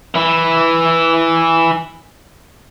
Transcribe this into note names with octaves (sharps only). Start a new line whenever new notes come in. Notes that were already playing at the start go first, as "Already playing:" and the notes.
E3 E4